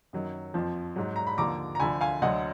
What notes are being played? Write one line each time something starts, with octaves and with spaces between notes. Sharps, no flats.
F#2 D#3 F#3
F2 F3
G#2 F#3
A#5
B5
D#2 D3 F3 A#5 D6
A#5
D2 D3 F3 G#5 B5
F5 G#5
D2 D3 F#3 D#5 F#5